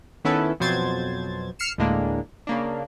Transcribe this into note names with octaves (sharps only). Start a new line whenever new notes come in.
D#3 B3 C#4 E4 A4 B4
F2 B2 F#3 C5 G#6 A6
F6 C7 C#7 E7
D2 A2 G#3 A#3 D4
C#3 A#3 D4